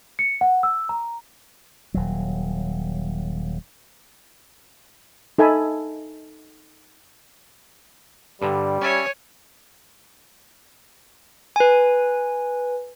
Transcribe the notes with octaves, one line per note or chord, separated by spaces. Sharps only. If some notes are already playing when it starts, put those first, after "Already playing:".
C#7
F#5
E6
A#5
D#1 F#3
D#4 A4 E5 G#5 A5 B5
G2 D3 G3
C#4 C#5 D5 E5 G#5
B4 G#5